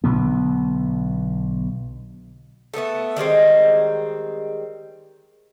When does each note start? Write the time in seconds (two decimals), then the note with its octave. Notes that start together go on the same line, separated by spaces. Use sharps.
0.04 B1 B2 D3 B3
2.74 A3 B3 G4 A4
3.16 D#3 G3 G#3 C4